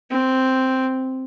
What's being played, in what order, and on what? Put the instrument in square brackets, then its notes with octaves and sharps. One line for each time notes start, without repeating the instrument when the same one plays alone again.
[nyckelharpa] C4